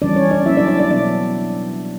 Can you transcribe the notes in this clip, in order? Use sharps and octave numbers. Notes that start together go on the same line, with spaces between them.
C#3 E3 G3 C#4 D4 D5
C#4 C#5
D4 D5
F#3 A#3 C#4 E4 E5
D4 D5
D4 D5
D4 D5
B2 F#3 B3 D4 D5